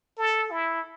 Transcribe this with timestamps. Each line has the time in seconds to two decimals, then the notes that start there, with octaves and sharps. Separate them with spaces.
0.18 A4
0.51 E4